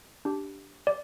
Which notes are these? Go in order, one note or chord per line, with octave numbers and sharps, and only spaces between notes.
D4 G4
D5